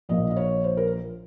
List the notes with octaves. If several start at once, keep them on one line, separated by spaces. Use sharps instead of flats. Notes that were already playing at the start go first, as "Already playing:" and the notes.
A#1 A#2 F3 A#3 D#5
D#5
C#5
C5
A#4